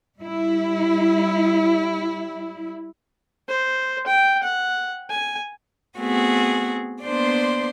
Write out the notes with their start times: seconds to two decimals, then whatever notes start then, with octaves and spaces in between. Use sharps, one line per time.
0.19 G3 E4
3.48 C5
4.06 G5
4.43 F#5
5.10 G#5
5.98 A3 B3 C4 F#4 G#4
7.04 A#3 B3 D4 C5 D5 C6